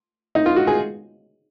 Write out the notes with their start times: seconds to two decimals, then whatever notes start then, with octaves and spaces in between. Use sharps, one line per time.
0.35 D#4
0.46 F4
0.56 F#4
0.67 G#4